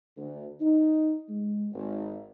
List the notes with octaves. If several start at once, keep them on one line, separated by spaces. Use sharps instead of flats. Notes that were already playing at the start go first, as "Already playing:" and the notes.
D2
D#4
G#3
G#1